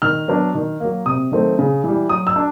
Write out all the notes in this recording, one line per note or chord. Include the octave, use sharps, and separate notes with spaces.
D#3 F6
F#3 B3 D4
D#3
F#3 A#3
C3 D#6
D#3 F#3 A3 C4
C#3
E3 G3
F#3 D#6
E6
D4